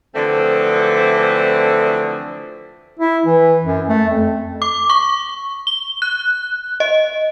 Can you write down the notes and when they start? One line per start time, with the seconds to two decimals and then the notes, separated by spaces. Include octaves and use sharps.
0.15 D3 E3 F3 A3 C4
2.99 E4
3.25 E3
3.65 F#2
3.89 A3
4.10 F2
4.62 D6
4.90 C#6
5.67 G7
6.02 F#6
6.80 D#5